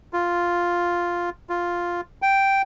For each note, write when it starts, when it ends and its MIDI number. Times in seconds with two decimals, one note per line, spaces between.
0.13 1.30 65
1.49 2.01 65
2.22 2.62 79